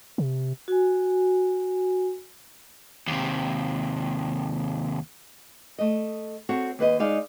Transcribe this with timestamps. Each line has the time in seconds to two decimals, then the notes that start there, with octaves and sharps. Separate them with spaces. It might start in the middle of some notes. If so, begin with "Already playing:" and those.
0.18 C3
0.68 F#4 G#5
3.08 D#2 C3
5.78 A3 D#5
6.49 C4 F#4 A4 C#5
6.79 D#2 B4 D#5
6.99 G#3 D#4 D5 F5